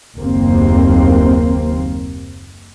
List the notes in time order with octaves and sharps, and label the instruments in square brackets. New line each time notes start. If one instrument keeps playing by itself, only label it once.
[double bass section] F#1 D#2 A#3 C4